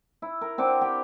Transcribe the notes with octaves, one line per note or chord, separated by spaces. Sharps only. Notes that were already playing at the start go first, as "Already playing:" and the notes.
E4
A#4
C4 D4 F#5 D6
G4 G5